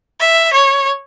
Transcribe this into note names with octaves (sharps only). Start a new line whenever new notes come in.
E5
C#5